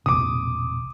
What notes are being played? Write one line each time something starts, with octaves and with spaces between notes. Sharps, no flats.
E1 A#1 C3 D6 D#6